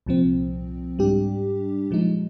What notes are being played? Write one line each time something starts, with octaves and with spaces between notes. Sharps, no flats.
C2 A#2 F3 C4
G#2 G3 D4 G4
A#2 F3 G#3 D#4